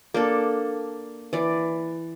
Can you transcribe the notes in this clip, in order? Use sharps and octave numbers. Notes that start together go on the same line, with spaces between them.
A#3 D4 A4
E3 D5